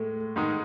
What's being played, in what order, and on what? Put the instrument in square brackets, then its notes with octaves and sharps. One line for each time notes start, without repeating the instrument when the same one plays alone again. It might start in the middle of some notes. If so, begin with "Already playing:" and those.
Already playing: [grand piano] A2 G#3 [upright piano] A3
[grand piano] G#2 D#3 G#3 D#4